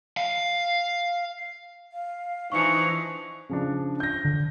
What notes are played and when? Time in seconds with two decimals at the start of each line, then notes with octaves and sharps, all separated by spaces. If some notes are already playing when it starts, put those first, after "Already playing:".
0.17 F5
1.92 F5
2.52 E3 F3 D4 D#4 C#6 C#7
3.49 C#3 F3 D4
4.00 G6 A#6
4.25 D3